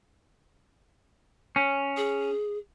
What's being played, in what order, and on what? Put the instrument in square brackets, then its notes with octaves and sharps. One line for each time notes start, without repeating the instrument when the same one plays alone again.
[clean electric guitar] C#4
[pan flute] G#4